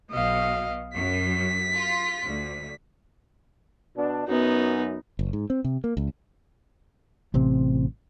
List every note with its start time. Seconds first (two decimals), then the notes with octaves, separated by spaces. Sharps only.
0.11 B1 B2 D#5 F5
0.95 F#2 B6
1.76 F4
2.23 D2
3.97 B2 D4
4.28 F#2 B3 D#4
5.19 F#1
5.33 G#2
5.50 C4
5.64 C3
5.84 A#3
5.97 C#2
7.34 A1 C3 C4